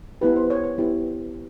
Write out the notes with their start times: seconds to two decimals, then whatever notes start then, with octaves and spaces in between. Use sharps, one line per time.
0.21 B3 E4 G4 B4
0.36 C5
0.50 C#5
0.64 C#5
0.78 B3 E4 G4